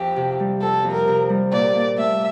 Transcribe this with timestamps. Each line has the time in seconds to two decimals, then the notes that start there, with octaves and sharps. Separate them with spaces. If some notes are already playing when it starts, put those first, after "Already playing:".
Already playing: F2 G4
0.16 C3
0.40 G3
0.62 F2 A4
0.84 F2
0.92 A#4
1.08 C3
1.29 G3
1.52 A#2 D5
1.74 A#2
1.98 A3 E5